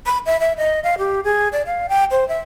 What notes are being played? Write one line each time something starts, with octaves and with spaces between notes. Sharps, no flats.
B5
E5
E5
D#5
F5
G4
G#4
D5
F5
G5
C5
E5